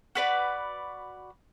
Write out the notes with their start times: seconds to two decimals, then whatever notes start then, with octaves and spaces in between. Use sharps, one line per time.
0.15 F#4 B4 D5